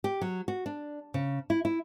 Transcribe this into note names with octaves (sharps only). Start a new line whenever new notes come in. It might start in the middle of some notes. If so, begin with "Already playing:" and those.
G4
F#3
F#4
D4
C#3
E4
E4